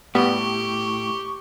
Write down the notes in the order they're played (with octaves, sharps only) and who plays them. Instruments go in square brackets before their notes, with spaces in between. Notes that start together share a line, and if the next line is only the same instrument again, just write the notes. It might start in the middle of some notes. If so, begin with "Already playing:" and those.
[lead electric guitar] A2 [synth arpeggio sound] G3 B3 [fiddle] G4 [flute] C#6